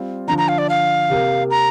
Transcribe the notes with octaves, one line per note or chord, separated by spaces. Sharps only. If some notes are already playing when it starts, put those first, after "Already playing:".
Already playing: G3 C4 F4
D3 F3 D4 A#5
A#5
F5
D5
F5
C3 A#3 G4 A#4
A#5